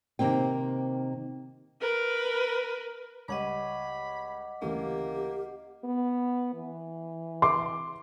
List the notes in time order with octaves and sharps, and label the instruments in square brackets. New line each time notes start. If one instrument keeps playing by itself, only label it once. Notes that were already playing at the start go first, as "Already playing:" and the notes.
[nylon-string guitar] C3 D#3 A#3 C4 G5
[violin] A#4 B4
[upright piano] C#2 G3 C#5 [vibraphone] D#5 F#5 D6 [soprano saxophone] B5
[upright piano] D2 C#3 E3 [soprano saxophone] A#3 [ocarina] G4
[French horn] B3
E3
[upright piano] C6 D6